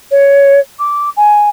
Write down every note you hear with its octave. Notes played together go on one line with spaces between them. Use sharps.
C#5
D6
G#5